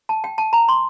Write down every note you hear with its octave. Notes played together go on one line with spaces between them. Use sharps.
A5
G5
A5
A#5
C6